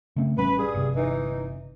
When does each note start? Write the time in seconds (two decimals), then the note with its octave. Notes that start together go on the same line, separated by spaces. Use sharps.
0.16 C#3 A3 C4
0.37 A1 G3 C#4 B4
0.58 G2 G#4
0.74 G1 C3
0.95 E3 D#4